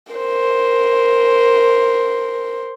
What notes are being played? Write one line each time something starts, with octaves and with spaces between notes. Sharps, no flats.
A#4 C5